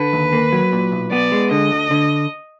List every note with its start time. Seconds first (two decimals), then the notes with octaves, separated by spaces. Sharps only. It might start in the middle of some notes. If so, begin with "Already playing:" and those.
Already playing: D3 B4
0.13 D#2
0.32 A#3
0.52 F#3
0.72 A#2
0.92 B1
1.12 B3 D5
1.32 G#3
1.51 D3 D#5
1.71 D2
1.91 D3